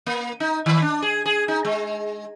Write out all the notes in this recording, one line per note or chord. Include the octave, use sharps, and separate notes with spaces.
A#3
D#4
D#3
D4
G#4
G#4
D#4
G#3